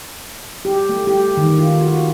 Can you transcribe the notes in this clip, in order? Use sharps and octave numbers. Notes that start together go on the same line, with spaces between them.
G4
A3
G4
D#3
F4
F#4